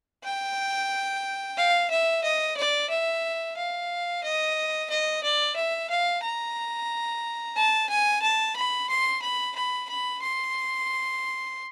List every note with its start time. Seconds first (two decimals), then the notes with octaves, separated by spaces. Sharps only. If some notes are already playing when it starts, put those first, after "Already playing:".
0.24 G5
1.57 F5
1.90 E5
2.24 D#5
2.57 D5
2.90 E5
3.57 F5
4.23 D#5
4.90 D#5
5.23 D5
5.56 E5
5.90 F5
6.23 A#5
7.56 A5
7.89 G#5
8.22 A5
8.56 B5
8.90 C6
9.22 B5
9.56 B5
9.89 B5
10.23 C6